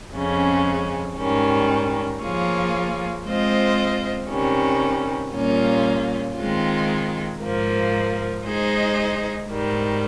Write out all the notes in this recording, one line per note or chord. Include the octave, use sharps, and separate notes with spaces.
F2 C#3 G#3 C#4
G#2 D#3 G3 C#4
F3 A#3 F4 G#4 C#5
G#3 C4 F4 C5 D#5
C3 D#3 G3 C#4
A#2 G3 A#3 C#4 F4
D#3 G#3 C4 F4
G#2 F3 A#3
G#3 D#4 G#4 C5 D#5
G#2 D#3 G3